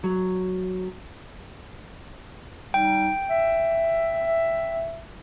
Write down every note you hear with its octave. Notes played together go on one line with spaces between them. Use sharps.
F#3
G3 D#4 G5
E5